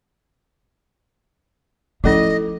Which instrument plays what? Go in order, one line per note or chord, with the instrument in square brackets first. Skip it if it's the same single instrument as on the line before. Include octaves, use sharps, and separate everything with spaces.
[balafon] F3 A3 C#4 [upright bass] D#4 [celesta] E4 A4 D6 [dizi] D#5